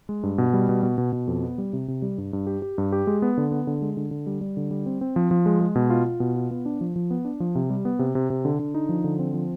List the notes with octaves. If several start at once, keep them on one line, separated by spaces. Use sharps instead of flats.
G#3
G2
B2
G3
B2
B2
B2
B2
F2
B3
G3
C3
C3
G3
G2
G2
G4
G4
G2
G4
G#3
B3
D3
B3
D3
G#3
D3
D3
G3
G3
D3
G3
C4
C4
F3
F3
G#3
G#3
B2
F4
F4
B2
F4
B3
D4
F3
F3
B3
D4
F3
C3
G3
B3
C3
C3
C3
D3
D3
D#4
F3
D3
C4
F3